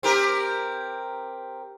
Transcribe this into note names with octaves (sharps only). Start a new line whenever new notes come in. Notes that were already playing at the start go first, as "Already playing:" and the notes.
C4 G4 A#4